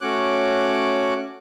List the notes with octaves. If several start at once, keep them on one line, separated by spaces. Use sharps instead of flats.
A3 C#4 F#4 C#5 D6 F#6